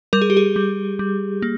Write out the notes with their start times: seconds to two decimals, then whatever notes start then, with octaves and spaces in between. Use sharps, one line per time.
0.13 G3 A#4
0.22 G#4
0.30 G4
0.37 G#4
0.56 G3
0.99 G3
1.42 A#3